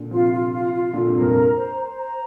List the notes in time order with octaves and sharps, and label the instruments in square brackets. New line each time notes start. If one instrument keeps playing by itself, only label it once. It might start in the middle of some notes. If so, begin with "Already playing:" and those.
Already playing: [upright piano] A#2 D3
[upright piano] C3 F3 [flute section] F4
[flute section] F4
F4
F4
[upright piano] A#2 D3 [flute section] F4
[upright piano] G2 C3
[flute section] A#4
[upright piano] F2 A#2
[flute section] A#5
C5
C5
A#5